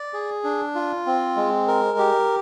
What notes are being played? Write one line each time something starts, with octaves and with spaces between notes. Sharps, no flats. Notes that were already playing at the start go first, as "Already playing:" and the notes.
Already playing: D5
G#4
D4
F4
C4
G#3
A#4
G4